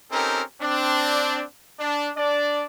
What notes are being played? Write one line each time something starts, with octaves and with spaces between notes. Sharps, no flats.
C4 C#4 D#4 G4 A4 A#4
C4 D4
D4
D4 D5